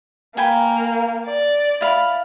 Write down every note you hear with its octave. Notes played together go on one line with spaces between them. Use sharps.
A#3 B4 G5 G#5
D5
E4 F5 B5